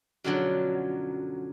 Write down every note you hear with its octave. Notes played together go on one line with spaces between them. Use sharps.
F#2 B2 D3 F3 F#3